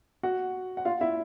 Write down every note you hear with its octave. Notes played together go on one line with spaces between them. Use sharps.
F#4 F#5
F#5
F4 F5
E4 E5